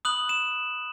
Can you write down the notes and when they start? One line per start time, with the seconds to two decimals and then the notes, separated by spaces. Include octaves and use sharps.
0.05 B5 D#6 F#6 F#7
0.29 E7